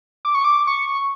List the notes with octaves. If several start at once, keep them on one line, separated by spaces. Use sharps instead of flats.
D6
C#6
D6
C#6